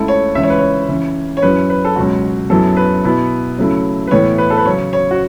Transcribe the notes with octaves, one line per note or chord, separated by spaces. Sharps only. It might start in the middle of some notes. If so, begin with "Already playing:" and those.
Already playing: C#2 C#3 A3 E4 A4
C#5
C#2 C#3 E3 E5
C#5
B4
C#5
C#3 E3 C#4
C#5
F#2 F#3 C#4 E4 B4
B4
A4
C#2 B2 F#3 C#4 F#4
F#2 F#3 B3 E4 A4
B4
B2 B3 E4
C#3 F#3 A3 C#4 E4
B4
A2 E3 B3 C#5
B4
A4
B4
C#3 F#3 C#4 C#5
C#5
F#4